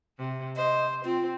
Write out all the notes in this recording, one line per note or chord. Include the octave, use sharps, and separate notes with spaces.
C3
C5 D#5
C4 F4